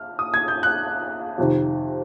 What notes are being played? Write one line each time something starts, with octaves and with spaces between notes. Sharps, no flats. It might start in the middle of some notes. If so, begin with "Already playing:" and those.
Already playing: F6
D#6
G#6
G6
F#6
F2 C3 D#3